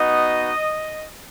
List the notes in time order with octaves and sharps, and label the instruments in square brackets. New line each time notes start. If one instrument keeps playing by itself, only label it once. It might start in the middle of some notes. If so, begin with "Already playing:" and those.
Already playing: [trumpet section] B3 D#4 F#4 D#5